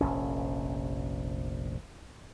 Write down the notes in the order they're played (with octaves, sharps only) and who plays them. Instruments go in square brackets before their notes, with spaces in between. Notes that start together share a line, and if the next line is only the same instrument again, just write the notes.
[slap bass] F1 A#1 C#4